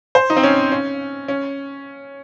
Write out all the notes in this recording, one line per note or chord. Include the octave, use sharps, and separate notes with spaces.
C5
D#4
C4
C#4
C#4
C#4